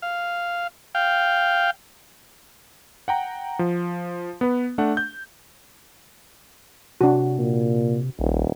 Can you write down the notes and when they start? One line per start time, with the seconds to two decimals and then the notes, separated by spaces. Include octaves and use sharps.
0.02 F5
0.95 F5 G5
3.08 F#5 G5 A#5
3.59 F3
4.41 B3 B4
4.78 A3 D4 F#5
4.97 G6
7.01 C3 D4 F#4
7.38 A#2
8.19 D#1 A#1